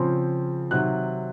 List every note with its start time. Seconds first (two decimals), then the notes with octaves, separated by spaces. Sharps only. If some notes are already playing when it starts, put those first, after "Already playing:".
Already playing: C#3 F3 C4
0.71 C3 D#3 F#3 F#6